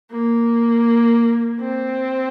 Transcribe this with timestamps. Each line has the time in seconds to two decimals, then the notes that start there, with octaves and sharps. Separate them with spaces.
0.11 A#3
1.61 C4